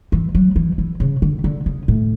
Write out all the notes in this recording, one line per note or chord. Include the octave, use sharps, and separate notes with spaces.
E3
F#3
E3
E3
C#3
D3
D3
C#3
A2